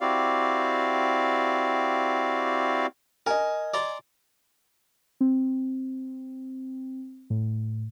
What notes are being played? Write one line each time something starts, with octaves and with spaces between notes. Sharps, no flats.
C4 E4 F#4 G4 D5 F5
A#4 D#5 G#5
D5 A#5 C6
C4
A2